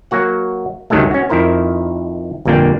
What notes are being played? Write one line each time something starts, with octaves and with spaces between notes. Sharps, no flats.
F#3 A#3 F#4 F#5
C#2 G2 D#3 F#3 G#3 A3
C#4 F#4
F2 D#3 E4 A#4 C5
G1 F2 A#2 A#3 D4 G5